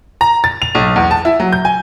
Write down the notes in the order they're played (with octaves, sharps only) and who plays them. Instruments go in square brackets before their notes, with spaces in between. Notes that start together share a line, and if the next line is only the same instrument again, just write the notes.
[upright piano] A#5
A6
F7
B1
E2
A5
E4
F#3
G6
G#5